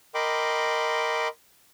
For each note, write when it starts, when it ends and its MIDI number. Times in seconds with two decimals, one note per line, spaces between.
0.15 1.28 70
0.15 1.28 75
0.15 1.28 79
0.15 1.28 83
0.15 1.28 84
0.15 1.28 86